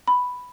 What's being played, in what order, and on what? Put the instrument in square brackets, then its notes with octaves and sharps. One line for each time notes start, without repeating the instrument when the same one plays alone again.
[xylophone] B5